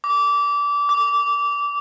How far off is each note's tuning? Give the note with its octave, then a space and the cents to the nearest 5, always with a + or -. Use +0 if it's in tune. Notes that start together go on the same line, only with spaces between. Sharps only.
D6 -25
D6 -15